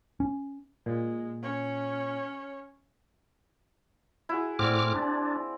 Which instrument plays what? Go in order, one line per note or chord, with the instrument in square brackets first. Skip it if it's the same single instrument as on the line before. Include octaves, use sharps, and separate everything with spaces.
[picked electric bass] C#4
[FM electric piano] A#2 [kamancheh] G#3
[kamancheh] C#4 C#5
[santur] E4 F#4 G#4
[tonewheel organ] A2 D6 F6 [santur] C4 F#4 D5
[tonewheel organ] D4